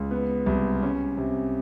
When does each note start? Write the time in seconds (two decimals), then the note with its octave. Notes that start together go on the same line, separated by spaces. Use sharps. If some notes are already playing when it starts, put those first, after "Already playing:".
Already playing: C#2
0.11 B3
0.46 C2
0.83 C#4
1.18 C3